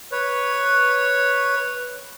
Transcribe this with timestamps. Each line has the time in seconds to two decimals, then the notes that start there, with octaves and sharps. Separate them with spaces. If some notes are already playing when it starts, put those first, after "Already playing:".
0.12 B4 C#5